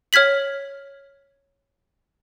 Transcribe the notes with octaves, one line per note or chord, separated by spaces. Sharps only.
C#5 F6 G#6 B6 F#7